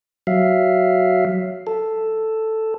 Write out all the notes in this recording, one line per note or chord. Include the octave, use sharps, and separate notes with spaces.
F#3 E5 F5
A4